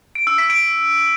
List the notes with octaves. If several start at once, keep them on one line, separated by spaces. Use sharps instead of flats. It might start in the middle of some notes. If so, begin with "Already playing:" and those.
D7
E6
B6
D7